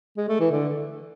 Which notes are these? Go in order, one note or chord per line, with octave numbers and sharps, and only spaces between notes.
G#3
A3
E3
D3